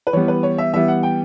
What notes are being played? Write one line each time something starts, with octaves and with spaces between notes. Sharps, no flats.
B4
E3 G3 B3 C#5
B4
C#5
E5
E3 G3 B3 E5
F#5
G5